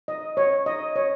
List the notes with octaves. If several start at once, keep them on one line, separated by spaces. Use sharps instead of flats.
D#5
C#5
D#5
C#5